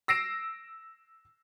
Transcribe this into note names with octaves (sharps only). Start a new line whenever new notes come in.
E6 A#6 C7 D7 E7